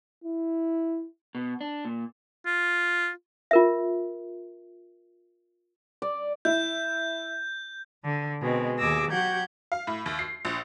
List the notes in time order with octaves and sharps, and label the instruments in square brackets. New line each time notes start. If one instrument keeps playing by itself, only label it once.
[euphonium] E4
[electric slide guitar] B2
D4
A#2
[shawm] F4
[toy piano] F4 A#4 E5
[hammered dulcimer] D5
[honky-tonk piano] E4 [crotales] G6
[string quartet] D3
B2 G#3 C4
D#2 G#4 D6 E6 A#6
F#3 F#4 G4 F#5 G6 G#6
[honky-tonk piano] F5
A2
D#2
C7
A#1